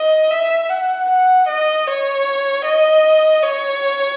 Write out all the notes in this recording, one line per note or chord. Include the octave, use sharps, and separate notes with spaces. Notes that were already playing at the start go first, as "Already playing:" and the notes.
Already playing: D#5
E5
F#5
F#5
D#5
C#5
D#5
C#5